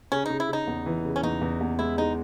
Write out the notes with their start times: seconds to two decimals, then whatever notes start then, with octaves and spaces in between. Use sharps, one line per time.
0.12 C#3 C#4
0.26 C#3 D#4
0.40 E4
0.49 C#3 D#4
0.67 E2
0.86 E3
1.05 C#3
1.16 C#4
1.23 E2 D#4
1.41 E2
1.61 E2
1.79 G#3 E4
1.97 G#3 D#4